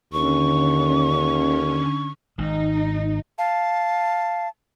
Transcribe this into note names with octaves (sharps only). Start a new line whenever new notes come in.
D#2 D3 C#4 C#6
G#1 G#2 D#4
F5 A5